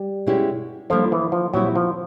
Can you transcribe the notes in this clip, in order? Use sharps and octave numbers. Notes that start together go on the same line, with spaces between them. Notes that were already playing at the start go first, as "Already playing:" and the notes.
Already playing: G3
B2 G#3 C#4 E4 G4
F3 G3 A#3 D4 F4 A4
E3
F3
A#2 F#3 G3 C4 E4
F3